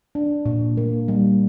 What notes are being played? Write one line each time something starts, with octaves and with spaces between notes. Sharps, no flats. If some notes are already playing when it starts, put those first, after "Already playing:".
D4
A#2
A#3
G3